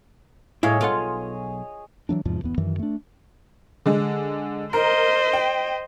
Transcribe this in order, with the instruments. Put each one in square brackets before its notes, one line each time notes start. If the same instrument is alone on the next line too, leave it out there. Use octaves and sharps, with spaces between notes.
[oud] A2 [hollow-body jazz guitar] E4 F5 [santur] G#4 C#5 D#5
[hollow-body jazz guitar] B1 A4 F#5 [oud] F4
[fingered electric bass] E3 F#3 A3 D4
E2 G#2 C3 F3
D1 E2 B3
F#2 D#3 E3
A3 D4
[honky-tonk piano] D3 G#3
[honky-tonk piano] A#4 A#5 [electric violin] C5 D#5
[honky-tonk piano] G5